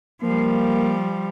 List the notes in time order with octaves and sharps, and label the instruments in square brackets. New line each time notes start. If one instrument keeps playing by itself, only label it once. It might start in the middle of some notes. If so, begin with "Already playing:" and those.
[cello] F3 G3 [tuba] A#3